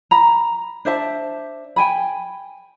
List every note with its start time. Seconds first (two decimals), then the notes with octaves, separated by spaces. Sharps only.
0.11 A#5 B5
0.85 D4 C5 E5 A5
1.76 G5 G#5 B5